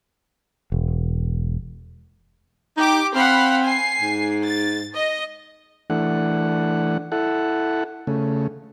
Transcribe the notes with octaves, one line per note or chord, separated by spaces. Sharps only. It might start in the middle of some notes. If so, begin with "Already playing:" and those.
E1
D#4 G4 D6
C4 F5 F#5 B5
G#5 C7
G#2
A6
D#5
E3 A3 D4 F#5
E4 A4 F#5
C#3 A3